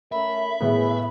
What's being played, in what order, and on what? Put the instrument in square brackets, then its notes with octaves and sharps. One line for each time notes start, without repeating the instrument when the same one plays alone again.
[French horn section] A3 C#4 A#4 [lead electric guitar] E5 [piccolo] B5
[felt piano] A2 B3 [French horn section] E3 E4 G#4